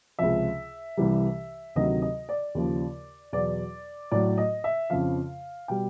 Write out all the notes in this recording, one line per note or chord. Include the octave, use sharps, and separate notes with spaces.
C#2 C3 F3 E5
C2 C3 E3 G3
D2 C3 D#3 F#3 D#5
D#5
D5
D#2 C#3 F3
E2 B2 F#3 D5
A2 F#3 D5
D#5
E5
F2 C#3 F3 F5
B2 G3 G5